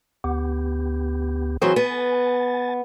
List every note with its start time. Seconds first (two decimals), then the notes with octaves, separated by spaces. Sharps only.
0.24 D2 B3 G4
1.62 E3 F#3 C4 G#4 C5
1.76 B3 G#5 A6